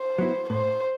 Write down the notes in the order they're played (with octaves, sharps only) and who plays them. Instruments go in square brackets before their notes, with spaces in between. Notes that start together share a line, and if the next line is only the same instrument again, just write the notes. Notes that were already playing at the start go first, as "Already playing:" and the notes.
Already playing: [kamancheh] C5
[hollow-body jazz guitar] F#3 B3 E4
[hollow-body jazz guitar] A2 [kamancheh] C5